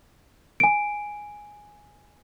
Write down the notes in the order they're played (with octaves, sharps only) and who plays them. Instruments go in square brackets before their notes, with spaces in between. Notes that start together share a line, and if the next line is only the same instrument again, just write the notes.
[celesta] G#5 D7